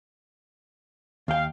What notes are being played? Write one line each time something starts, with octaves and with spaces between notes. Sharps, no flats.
D#2 F5 G5